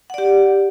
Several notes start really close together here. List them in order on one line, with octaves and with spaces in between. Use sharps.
F#5 D5 G4